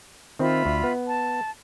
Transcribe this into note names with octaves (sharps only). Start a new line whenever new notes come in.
D#3 C4 F4 E5 B5
D2
B3
A5